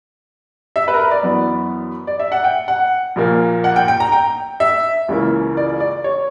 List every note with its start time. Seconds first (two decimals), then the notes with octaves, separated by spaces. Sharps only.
0.76 E5
0.88 B4
0.94 A#4
1.00 B4
1.11 D5
1.23 F#2 E3 B3
2.07 D5
2.20 E5
2.32 F#5
2.44 G5
2.68 F#5
3.16 A#1 A#2 A#3
3.64 F#5
3.76 G5
3.88 G5
4.00 A#5
4.12 G5
4.60 E5
5.09 C#2 C#3 E3 A#3
5.57 D5
5.80 D5
6.04 C#5